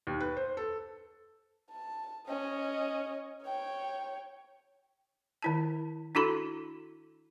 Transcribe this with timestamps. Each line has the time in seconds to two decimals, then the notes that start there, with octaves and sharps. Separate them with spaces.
0.07 D#2
0.20 B4
0.37 C5
0.57 A4
1.71 A5
2.27 C#4 D#5
3.43 C#5 G5
5.42 D#3 E4 A5
6.15 D4 E4 F#4 A4 B5 C6